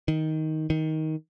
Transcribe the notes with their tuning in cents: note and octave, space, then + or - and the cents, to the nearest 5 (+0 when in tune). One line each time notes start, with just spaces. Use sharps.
D#3 +10
D#3 +15